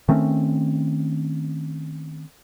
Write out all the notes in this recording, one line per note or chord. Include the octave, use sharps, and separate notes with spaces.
D#3 A3 C4 C#4